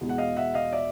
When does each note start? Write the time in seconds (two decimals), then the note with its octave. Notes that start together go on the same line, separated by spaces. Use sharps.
0.01 E2 B2 G#3
0.09 F#5
0.18 D#5 F5
0.36 E5 F#5
0.54 D#5 F5
0.72 D5 E5